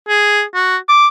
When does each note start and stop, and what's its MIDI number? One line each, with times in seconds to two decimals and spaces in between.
0.08 0.42 68
0.55 0.77 66
0.88 1.08 86